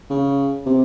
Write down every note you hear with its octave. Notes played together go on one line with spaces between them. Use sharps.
C#3
C3